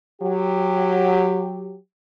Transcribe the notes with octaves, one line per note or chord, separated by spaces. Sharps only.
F#3 G4